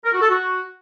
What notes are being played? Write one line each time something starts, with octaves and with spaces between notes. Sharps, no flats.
A#4
F#4
A4
F#4